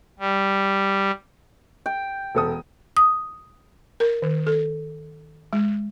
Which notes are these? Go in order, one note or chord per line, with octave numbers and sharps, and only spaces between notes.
G3
G5
E1 A4 D#6
D#6
A#4
D#3
A4
G#3